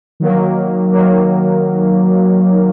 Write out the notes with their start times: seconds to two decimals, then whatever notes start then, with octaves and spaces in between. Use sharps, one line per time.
0.20 D#3 F#3 A#3
0.92 D#3 F#3 A#3